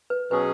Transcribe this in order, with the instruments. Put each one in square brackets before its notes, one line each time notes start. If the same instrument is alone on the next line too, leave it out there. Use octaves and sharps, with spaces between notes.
[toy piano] B4
[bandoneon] B2 F#3 C#4 G#4 [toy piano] B4